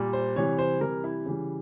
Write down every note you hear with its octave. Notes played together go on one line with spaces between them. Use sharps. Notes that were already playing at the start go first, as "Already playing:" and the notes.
Already playing: A#2 G3
C5
C3 E3 G3 C#5
C5
C3 E3 G3 A#4
E4
C#3 E3 G3